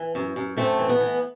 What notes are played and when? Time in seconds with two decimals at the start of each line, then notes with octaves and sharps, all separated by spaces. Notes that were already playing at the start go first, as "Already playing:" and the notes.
Already playing: E3
0.15 F#2
0.36 F#2
0.57 F#2 A3 C4
0.79 E3
0.89 B3
1.01 E3